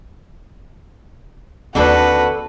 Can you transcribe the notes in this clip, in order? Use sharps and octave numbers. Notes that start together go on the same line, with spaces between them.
D#2 D3 C4 D4 F#4 A4 B4